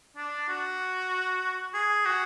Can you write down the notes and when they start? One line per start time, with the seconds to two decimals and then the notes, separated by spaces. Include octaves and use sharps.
0.16 D4
0.49 F#4
1.74 G#4
2.05 F#4